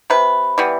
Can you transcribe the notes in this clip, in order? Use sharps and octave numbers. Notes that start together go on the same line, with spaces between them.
C3 B4
E3 G3 B3